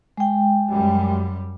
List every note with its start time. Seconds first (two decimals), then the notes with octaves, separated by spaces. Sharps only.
0.17 G#3 G5
0.69 F#2 G3